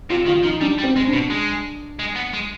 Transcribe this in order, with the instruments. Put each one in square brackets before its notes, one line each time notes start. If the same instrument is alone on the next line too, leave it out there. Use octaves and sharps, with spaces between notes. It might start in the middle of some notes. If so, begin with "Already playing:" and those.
[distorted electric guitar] C3 [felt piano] F4
[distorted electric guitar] D#3 [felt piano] F4
[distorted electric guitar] F3 [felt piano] D#4
[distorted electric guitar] G3 [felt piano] D4
[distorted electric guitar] G3
[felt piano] C4
[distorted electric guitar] G#3
[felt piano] D4
[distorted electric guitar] B2
G#3
G#3
B3
G#3